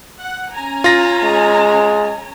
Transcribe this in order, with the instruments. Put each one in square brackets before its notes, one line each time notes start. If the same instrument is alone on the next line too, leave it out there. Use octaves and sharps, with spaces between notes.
[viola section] F#5
C#4 G#5 A#5
[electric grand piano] F4 A#6
[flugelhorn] G#3